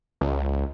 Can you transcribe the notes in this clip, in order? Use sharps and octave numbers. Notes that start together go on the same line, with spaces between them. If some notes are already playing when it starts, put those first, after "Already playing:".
C#2